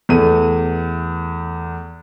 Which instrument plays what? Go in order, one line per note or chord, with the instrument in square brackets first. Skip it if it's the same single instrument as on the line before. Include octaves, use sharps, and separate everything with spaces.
[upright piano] E2 A3 D#7